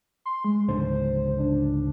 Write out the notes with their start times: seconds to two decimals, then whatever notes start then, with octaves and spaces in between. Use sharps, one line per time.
0.26 C6
0.45 G#3
0.69 C#2 G#2 D3 C5
1.39 D4